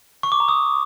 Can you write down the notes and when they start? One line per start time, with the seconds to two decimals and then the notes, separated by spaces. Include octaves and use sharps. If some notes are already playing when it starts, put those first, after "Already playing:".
0.23 C#6
0.32 D6
0.40 A#5
0.48 D#6